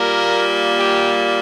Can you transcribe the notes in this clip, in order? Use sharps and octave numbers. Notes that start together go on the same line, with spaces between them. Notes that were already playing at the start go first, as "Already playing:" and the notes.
Already playing: A#2 G3 A#3 A#4
G4